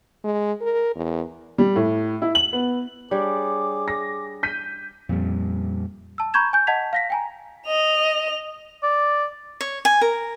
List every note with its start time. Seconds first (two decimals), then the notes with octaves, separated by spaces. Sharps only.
0.24 G#3
0.61 A#4
0.96 E2
1.58 G3
1.76 A2
2.22 E4
2.35 F#7
2.53 B3
3.11 G3 D4 G#4 C#5 D6
3.88 A#6
4.43 G6 B6 D#7
5.09 F2 A#2 G3
6.18 A5 E6
6.34 A#5 B5 C#6 G6 G#6 E7
6.53 G#5 G6
6.67 D#5 F#5 A5 G#6 B6 F7
6.93 F5 A#6 B6
7.10 G5 G#5 A#5
7.66 D#5 F7
8.83 D5
9.61 C#5
9.85 G#5
10.01 A#4